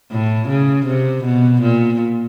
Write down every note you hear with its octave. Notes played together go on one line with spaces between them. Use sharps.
A2
C#3
C3
B2
A#2